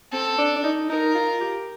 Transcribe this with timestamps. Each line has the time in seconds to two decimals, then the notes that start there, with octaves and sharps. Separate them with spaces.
0.12 C4 A4
0.38 D4
0.56 D4
0.64 D#4
0.89 D#4 A#4
1.15 F4
1.41 G4